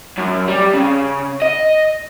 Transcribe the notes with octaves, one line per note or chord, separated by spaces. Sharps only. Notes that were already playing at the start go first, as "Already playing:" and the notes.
F#2
G3
C#3
D#5